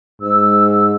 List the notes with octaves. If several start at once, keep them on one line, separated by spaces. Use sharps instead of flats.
G#2 E6